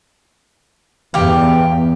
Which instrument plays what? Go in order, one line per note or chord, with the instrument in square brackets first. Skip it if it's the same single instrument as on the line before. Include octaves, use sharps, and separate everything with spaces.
[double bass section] E2 [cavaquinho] G4 F5